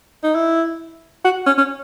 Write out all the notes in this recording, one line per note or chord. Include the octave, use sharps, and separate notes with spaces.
D#4
E4
F#4
C#4
C#4